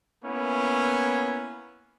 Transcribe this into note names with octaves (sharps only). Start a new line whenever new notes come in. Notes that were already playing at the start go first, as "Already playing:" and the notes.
A#3 B3 C#4 E4